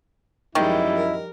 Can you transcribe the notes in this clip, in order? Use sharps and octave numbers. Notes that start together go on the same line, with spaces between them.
F#2 D#3 F3 G3 G#3 E4 D#5
A#4